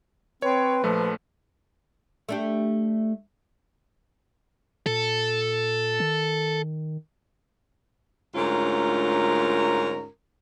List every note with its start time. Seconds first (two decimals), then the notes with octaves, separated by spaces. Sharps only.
0.42 C4 B4 C#5
0.83 A#1 F3 A3
2.29 A3 D4 G4
4.86 A#2 A4
6.00 D#3
8.35 D2 G#2 C#4 F4 A#4